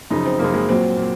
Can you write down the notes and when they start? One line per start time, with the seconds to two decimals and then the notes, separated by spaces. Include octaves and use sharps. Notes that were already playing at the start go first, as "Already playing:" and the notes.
0.11 F#2 C#3 F3 D#4
0.26 C4
0.39 F#2 C#3 F3 A#3
0.54 G#3
0.69 A#2 F#3 C4
0.97 A#2